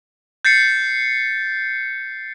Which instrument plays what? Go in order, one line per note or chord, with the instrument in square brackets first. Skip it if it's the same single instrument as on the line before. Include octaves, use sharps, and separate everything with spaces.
[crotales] G6 A6 C7 C#7